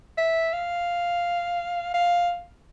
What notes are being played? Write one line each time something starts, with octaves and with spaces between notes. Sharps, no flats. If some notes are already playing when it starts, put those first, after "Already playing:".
E5
F5
F5